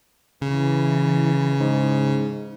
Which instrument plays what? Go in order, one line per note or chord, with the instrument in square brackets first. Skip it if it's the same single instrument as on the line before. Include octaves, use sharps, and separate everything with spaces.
[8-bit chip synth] C#3 [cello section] E3
[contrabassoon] G#2